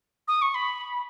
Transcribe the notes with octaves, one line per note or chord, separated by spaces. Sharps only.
D#6
C#6
B5